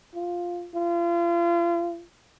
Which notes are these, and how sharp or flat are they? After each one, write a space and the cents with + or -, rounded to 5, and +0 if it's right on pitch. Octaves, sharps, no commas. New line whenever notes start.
F4 +5
F4 -35